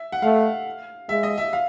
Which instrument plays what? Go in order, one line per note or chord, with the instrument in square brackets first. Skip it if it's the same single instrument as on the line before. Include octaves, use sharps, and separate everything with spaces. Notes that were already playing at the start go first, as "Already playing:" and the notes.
Already playing: [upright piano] E5
F#5
[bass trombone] A3 [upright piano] F5
[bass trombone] G#3 [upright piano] E5
[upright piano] D#5
E5
F5